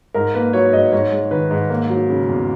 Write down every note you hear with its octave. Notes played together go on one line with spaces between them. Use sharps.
G#2 A#4
A#3 B4
F#3 C#5
G#2 D#5
G#2 C#5
G#3
D#3 B4
G#2
A#3
F#3
C#3
E2